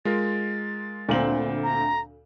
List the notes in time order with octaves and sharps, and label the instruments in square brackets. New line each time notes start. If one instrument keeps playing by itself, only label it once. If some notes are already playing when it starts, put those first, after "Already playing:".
[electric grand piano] G#3 F4 A#4 [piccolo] A6
[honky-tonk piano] D2 F#7 [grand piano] A#2 C4
[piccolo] A#5